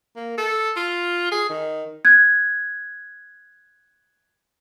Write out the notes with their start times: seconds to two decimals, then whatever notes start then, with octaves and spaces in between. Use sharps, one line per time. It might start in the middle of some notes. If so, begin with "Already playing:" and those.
0.16 A#3
0.38 A4
0.76 F4
1.31 G#4
1.49 D#3
2.05 F#6 G#6